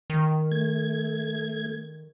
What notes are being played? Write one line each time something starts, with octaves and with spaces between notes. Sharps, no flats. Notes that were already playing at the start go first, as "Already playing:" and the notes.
D#3
A3 G#6